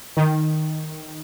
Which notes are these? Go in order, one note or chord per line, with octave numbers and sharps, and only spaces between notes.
D#3